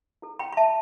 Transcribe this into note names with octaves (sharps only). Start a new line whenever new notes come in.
E4 A4
G5 B5
B5
E5 A5